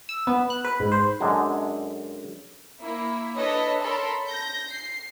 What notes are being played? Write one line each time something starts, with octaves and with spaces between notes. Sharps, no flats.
E6
B3
F#6
B4
G#2
C5
F#2 D3 G#3
A#3 E4
D4 A4 B4 C#5 D#5
A4 A#4 C#5 A5 B5 C6
G6 A#6
C7